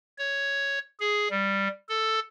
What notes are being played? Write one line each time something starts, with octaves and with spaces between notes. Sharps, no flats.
C#5
G#4
G3
A4